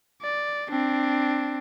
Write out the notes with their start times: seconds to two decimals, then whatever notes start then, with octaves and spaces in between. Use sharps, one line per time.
0.22 D5
0.70 C4 D4